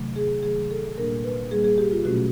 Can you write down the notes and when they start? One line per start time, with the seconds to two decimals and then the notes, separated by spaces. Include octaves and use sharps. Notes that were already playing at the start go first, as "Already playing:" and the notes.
Already playing: C3 D#3 F#3 A3
0.16 G#4
0.43 C3 D#3 F#3 A3 G#4
0.71 A4
0.97 A#2 G3 A#3 D4 A#4
1.24 B4
1.50 A#2 G3 A#3 D4 G#4
1.64 G#4
1.78 G4
1.91 F4
2.05 B2 F#3 A3 C#4 F#4